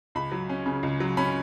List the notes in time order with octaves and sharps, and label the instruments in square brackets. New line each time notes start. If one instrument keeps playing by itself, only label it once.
[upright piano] C#2 B5
F#3
C#4
C#3
C#2
F#3
C#4 B5